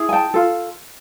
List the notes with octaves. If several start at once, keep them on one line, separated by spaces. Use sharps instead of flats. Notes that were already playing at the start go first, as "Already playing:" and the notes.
Already playing: E4 G#4
G#5
G5 A5
F4 A4